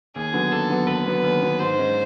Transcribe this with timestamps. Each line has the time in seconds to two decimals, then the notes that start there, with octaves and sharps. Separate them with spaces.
0.16 D#2 G#4
0.34 D3 F#3 B3
0.52 D#2 A4
0.70 D3 F#3 B3
0.88 D#2 B4
1.06 D3 F#3 B3
1.24 D#2
1.41 D3 F#3 B3
1.59 G#2 C5
1.78 D#3 G#3 C#4